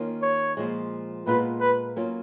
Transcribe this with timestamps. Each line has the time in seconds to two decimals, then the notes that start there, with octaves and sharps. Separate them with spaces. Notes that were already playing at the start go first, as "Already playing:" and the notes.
Already playing: D#3 A#3 C#4 F4
0.22 C#5
0.57 A#2 F3 G#3
1.27 A#2 G#3 B3 F4 B4
1.61 B4
1.96 F#3 A#3 C#4 F4